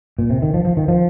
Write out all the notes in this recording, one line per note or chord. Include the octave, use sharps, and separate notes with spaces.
A#2
C3
D#3
F3
F3
D#3
F3